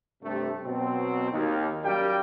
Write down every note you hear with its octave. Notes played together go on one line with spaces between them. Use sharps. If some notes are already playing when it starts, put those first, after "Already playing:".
G2 C3 A3
B2 F#3 C4
D#2
F#2 G3 G4 A#4 F5 G5